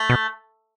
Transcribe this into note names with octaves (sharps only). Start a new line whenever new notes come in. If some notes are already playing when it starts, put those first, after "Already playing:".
Already playing: A3
B2